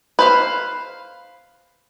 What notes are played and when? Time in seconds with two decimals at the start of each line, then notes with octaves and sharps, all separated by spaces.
0.19 B4 C5 F5